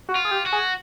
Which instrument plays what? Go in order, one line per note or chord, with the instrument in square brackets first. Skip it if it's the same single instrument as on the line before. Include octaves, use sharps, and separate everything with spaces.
[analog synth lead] F#4
[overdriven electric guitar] F4
[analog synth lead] G#4
G4
[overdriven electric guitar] F#4
[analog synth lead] G#4